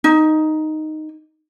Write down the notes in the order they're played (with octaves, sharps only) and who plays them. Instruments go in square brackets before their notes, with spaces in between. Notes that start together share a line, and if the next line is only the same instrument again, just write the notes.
[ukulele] D#4